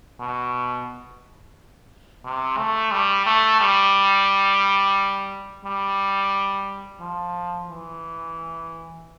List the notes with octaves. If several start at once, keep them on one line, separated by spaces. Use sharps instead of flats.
B2
C3
A3
G3
A3
G3
G3
F3
E3